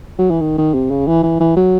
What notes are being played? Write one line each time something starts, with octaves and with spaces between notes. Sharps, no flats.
F#3
E3
D#3
D#3
C3
C#3
E3
E3
E3
F#3